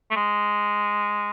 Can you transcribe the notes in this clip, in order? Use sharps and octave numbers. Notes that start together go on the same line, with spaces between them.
A3
G#3